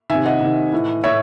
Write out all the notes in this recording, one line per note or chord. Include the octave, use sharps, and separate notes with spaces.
C3 D#3 E5 G#5
D#5 F#5
C3 D#3
A2 E3
A2 E3 C#5 E5